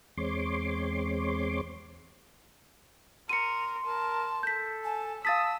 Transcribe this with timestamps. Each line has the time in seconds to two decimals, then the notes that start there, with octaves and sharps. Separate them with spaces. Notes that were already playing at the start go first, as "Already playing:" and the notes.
0.17 E2 G#3 C4 C#5 C6 D6
3.29 A#4 C6 C#7 D#7
3.86 A#4 A5
4.43 A4 G6 B6
4.84 G#5 A5
5.25 F5 A5 D#6 E6 A6 B6